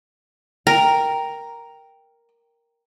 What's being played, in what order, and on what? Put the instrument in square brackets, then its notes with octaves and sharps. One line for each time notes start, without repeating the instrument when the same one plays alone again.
[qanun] A#4 [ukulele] G5